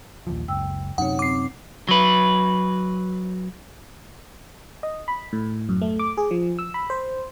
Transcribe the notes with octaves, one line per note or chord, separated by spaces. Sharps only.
A#1 D#2 F3
F#1 C#2 G5 E6
F#2 C3 D#4 C#5 F#5
C4 D6 C7
F#3 B4
D#5
B5
A2
F#2
A3
D6
G#4
F3
E6
B5
C5